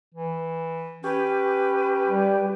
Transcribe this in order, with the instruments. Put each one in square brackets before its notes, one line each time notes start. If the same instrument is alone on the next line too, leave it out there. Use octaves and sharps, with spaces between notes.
[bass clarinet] E3
[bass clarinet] C#4 [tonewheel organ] G4 [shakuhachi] B4
[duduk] G3